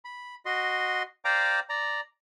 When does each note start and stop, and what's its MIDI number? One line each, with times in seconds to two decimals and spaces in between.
0.05 0.35 83
0.46 1.03 66
0.46 1.03 75
0.46 1.03 84
1.25 1.60 72
1.25 1.60 74
1.25 1.60 77
1.25 1.60 79
1.25 1.60 82
1.25 1.60 86
1.69 2.01 74
1.69 2.01 82